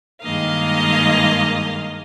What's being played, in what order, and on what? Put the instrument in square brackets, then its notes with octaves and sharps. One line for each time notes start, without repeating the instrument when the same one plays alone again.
[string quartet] G2 D#3 G#3 A#3 D#5 F5